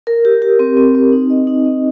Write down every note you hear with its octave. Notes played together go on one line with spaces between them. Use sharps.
A#4
G4
G4
C4
C4
C4
D#4
D#5
D#4
D#5